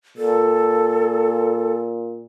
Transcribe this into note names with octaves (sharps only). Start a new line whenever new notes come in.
A#2 A4